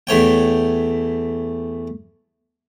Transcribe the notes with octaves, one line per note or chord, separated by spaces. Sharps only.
E2 A3 C#5 G5